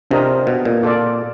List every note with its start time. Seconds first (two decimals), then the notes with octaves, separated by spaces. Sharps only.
0.11 C3 D4 F4 A#4 D#5
0.47 B2
0.65 A#2
0.83 F4 A4 D5